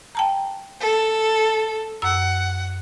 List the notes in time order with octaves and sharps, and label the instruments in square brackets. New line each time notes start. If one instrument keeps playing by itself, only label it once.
[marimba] G5 A5 A#5
[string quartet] A4
[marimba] F#2 E6 [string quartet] F#5